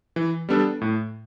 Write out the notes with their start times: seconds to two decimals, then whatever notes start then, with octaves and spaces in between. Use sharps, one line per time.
0.16 E3
0.49 G3 B3 D4 A4
0.81 A2